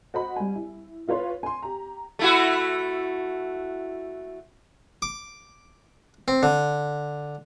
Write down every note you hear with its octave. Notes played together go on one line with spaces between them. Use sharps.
F#4 C5 D#5 F#5 B5
G3 G#5
E4
E4 F4 B4 C#5 C6
G#5 C6
G4 A#5
A3 E4 F#4
D6
C4
D3